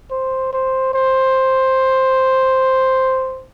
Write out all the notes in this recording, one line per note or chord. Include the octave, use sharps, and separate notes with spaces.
C5
C5
C5